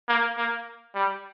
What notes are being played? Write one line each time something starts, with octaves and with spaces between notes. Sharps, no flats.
A#3
A#3
G3